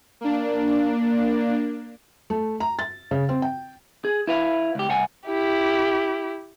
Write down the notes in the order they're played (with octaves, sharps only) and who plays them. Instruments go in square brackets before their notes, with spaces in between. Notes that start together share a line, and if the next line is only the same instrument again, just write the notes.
[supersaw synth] A#3 D4
[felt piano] A3
A#5
A6
C#3
C4
G5
[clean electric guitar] G#4
E4 B4 F5
C#2 G4
C2 F#5 G#5
[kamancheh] E4 G4